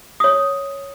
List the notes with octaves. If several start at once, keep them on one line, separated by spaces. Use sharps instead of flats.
C#5 D#6